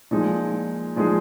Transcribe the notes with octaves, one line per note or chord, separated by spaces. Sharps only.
A#2 F3 G#3 D#4 G#4
A#2 F3 G#3 D#4 G#4